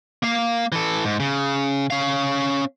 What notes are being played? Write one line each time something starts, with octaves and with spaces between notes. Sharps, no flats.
A#3 F5
E3 A4
G#2
C#3
C#4 F5